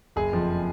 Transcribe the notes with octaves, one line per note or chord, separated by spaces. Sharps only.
F#1 G#4
F2 F3